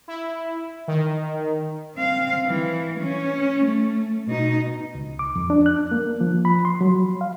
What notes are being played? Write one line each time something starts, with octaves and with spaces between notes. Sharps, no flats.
E4
D#3
C4 F5
E3
C#4
A3
B2 D#4
C#2
D6
F2
D4
F#6
A#3
F3
B5
C6
F#3
F5